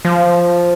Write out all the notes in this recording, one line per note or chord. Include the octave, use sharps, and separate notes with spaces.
F3